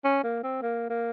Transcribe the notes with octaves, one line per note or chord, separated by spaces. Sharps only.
C#4
A#3
C4
A#3
A#3